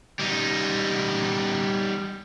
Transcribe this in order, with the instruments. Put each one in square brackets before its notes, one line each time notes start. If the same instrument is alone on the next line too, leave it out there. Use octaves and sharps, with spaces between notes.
[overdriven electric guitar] G3 D#4